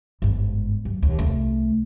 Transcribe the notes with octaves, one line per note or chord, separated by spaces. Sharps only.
G1 G#2
F#2
D#2 A#2
C2 A3